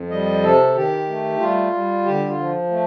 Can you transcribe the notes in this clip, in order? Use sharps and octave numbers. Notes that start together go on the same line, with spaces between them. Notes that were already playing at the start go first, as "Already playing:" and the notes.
Already playing: F2
G3 D#5
C3 A4
D#3 G4
A3
G3 F4
G3
D3 G4
F4
F3
A3